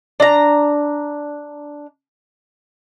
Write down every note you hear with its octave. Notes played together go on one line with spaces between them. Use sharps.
D4 A#5